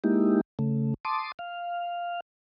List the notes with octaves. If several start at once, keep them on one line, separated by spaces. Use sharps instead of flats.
G#3 A#3 D#4 E4 G4
C#3 A3
A5 C6 D6 D#6
F5